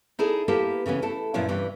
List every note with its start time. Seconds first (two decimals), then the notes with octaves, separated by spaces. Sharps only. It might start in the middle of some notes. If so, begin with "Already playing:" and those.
0.19 D#4 E4 G#4 A4 D5
0.48 A#3 B3 E4 G4 A4
0.86 C#3 E3 B3 C#4
1.02 A3 E4 A4
1.34 F#2 A#2 F3 B3 E4 C#5
1.49 G2 C3 E3